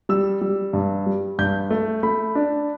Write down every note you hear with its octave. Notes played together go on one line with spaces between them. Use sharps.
G3 E6
G3
G2
G3
G2 G6
A3
A3 B5
D4